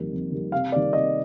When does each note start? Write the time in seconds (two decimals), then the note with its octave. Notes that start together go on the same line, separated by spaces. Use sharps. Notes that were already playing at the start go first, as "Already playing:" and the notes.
Already playing: F2 D#3 G3 A#3
0.12 F2
0.32 D#3 G3 A#3
0.52 C3 F5
0.72 D#3 G3 A#3 D5
0.93 C3 D#5